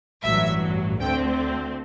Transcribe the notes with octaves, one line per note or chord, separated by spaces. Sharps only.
A1 G2 F#3 E5
D2 D3 A3 C4 G5